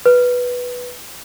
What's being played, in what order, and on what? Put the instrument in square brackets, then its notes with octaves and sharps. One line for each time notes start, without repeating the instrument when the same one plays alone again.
[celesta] B4